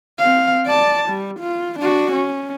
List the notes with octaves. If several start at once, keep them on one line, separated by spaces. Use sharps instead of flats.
C4 F5
D5 A5
G3
F4
D4 F#4
C#4